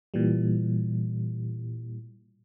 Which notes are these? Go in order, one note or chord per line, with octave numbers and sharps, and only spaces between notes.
A#2 E3 G3